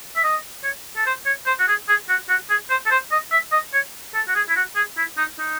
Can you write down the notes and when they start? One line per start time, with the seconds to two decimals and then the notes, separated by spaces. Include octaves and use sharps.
0.16 E5
0.24 D#5
0.64 C#5
0.97 A4
1.06 C5
1.26 C#5
1.46 C5
1.59 F#4
1.68 G#4
1.89 G#4
2.09 F#4
2.29 F#4
2.50 G#4
2.70 C5
2.86 A4
2.91 C5
3.11 D#5
3.32 E5
3.52 D#5
3.73 C#5
4.14 A4
4.28 F#4
4.35 G#4
4.49 E4
4.56 F#4
4.76 G#4
4.97 E4
5.17 D#4
5.39 D#4